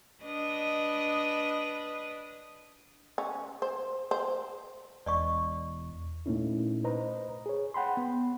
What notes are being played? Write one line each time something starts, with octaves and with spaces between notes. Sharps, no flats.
D4 B4 D#5
C#4
C5
C5
E1 D5 D#5 C#6
A#2 A3 A#3 C#4 D#4 E4
B4 C5 D#5 A#5
G#4 C#5
F#5 G5 B5 C6
B3